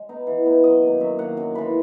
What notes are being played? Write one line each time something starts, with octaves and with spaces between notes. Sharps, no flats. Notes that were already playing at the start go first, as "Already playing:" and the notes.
Already playing: G#3
B3 D#4
E3
B3 D#4
F#2 D#5
D#3 A#3
F#2 E5
D#3 A#3 F#5
F#2 G#5
E3 G#3 B5